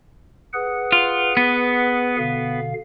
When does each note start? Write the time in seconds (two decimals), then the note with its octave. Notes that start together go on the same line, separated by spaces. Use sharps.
0.53 G#4 B4 F#5
0.92 F4
1.37 B3
2.17 B2 D3 F5